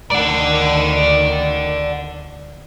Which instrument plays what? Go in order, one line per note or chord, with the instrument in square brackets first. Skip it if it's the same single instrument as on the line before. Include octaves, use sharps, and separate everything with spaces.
[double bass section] D2 D#3 [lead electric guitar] D5 F#5